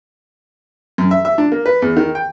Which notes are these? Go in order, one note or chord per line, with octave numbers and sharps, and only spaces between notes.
F#2
E5
E5
D4
A#3
B4
E2
D#3
G5